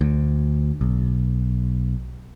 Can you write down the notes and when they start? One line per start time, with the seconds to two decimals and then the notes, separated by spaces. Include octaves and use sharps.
0.01 D2
0.81 B1